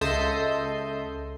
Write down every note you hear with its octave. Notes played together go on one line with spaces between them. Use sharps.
C#2 A4 D#5 E5 C6 G6